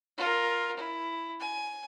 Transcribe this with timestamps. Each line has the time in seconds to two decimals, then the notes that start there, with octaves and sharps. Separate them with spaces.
0.18 F4 A#4
0.77 E4
1.40 G#5